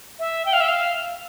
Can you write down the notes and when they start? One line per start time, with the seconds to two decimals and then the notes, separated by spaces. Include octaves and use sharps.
0.19 E5
0.45 G5
0.53 F5
0.60 E5
0.68 F5